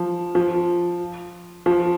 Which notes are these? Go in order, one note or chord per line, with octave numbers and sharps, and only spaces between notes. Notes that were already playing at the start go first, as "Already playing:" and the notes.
Already playing: F3
F3
F3